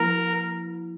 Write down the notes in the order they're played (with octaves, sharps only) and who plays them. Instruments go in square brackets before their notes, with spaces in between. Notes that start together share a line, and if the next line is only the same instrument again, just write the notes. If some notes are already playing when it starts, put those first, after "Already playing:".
Already playing: [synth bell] F3 A#3 E4 [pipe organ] A#4